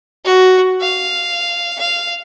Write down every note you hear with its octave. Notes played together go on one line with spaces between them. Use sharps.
F#4
F5
F5